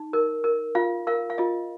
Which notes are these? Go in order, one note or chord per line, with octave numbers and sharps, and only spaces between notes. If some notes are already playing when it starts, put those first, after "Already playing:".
Already playing: D#4
A#4
A#4
F4 F5
A#4 F5
F5
F4 D#5